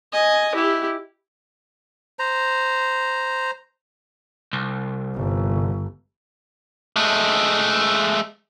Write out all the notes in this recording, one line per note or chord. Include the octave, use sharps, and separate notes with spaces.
D#5 G#5
E4 G4
C5 A#5
C2
G1
G#3 A3